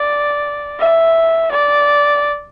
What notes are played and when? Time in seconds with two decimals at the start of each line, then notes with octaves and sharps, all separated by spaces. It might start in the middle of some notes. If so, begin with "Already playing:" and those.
Already playing: D5
0.79 E5
1.51 D5